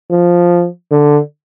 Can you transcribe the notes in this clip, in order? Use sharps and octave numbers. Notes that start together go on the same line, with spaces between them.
F3
D3